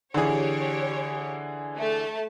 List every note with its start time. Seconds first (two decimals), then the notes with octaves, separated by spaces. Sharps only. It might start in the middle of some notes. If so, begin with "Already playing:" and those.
0.14 D3 E3 G4 G#4 C#5
1.77 A3 A5